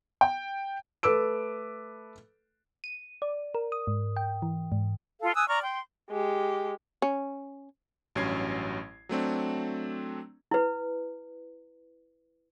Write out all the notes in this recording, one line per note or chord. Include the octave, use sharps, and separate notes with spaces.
G5
A3 A4 B4 D6 E6 D7
D#7
D5
A#4
D#6
G#2
G5
E3
G#2
F4 A4 F5
G#5 D#6 E6 F#6
D5 A#5 C#6 F6
G5 C6
G#3 G4
C#4
A1 G2 F#3 C#4 G#6 C7
F#3 A3 C4 D4
E4 B4